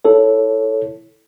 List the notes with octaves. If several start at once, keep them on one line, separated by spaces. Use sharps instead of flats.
E4 A4 C#5